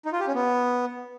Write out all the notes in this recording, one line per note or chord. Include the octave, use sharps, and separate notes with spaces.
D#4
F4
G4
C#4
B3